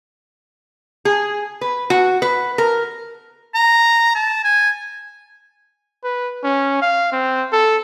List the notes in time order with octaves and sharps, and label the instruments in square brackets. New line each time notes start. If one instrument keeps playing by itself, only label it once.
[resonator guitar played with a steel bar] G#4
B4
F#4
B4
A#4
[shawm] A#5
A5
G#5
[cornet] B4
C#4
F5
C4
A4